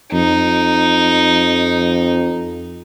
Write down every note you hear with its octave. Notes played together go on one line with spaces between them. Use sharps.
F2 D#4